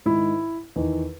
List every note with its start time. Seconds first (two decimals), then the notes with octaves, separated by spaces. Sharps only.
0.06 G#2 D#3 E4
0.76 E2 D#3